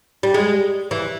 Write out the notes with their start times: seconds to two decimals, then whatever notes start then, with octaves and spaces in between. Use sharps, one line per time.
0.23 G3
0.34 G#3
0.91 E3